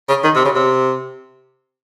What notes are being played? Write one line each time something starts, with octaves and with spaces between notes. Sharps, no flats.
C#3
D#3
C3
C#3
C3